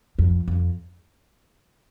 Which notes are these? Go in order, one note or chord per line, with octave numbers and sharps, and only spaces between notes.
F2
F2